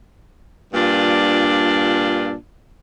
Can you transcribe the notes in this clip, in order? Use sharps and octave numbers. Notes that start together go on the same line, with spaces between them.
G2 A#2 D4 F4